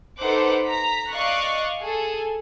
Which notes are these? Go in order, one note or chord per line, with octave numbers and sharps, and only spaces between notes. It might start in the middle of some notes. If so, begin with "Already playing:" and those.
D#4 A4 B4 C5 F#5 D6
A#5 B6
D5 D#5 F5 C#6 F#6
G#4 A4